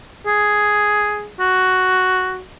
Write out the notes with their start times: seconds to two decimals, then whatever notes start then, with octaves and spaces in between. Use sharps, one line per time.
0.27 G#4
1.40 F#4